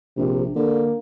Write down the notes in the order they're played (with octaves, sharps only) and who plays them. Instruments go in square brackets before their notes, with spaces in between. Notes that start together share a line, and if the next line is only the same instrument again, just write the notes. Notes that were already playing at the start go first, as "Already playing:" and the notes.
[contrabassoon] A#1 [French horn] C3
[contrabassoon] D3 [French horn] A#3